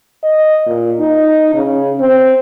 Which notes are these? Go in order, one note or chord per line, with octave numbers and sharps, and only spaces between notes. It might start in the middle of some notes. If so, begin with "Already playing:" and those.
D#5
A#2
D#4
C#3
C4